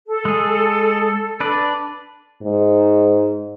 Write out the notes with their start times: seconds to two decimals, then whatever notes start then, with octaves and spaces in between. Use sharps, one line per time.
0.08 A4
0.25 G#3 G#4
1.40 D4 B4 D5
2.43 G#2